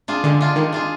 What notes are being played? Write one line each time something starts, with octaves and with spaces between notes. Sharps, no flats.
D4 F4 G#4
D3 G#3
D4 F4 G#4
D#3 G#3
D4 F4 G#4